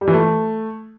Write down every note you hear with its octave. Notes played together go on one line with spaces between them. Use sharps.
G3
E3
A3